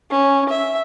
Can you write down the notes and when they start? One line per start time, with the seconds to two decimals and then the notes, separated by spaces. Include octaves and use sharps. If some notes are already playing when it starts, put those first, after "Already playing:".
0.11 C#4
0.49 E5